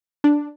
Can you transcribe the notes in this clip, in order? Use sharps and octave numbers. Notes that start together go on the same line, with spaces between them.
D4